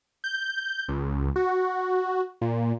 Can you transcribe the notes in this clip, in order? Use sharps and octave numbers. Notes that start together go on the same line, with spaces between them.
G6
C#2
F#4
A#2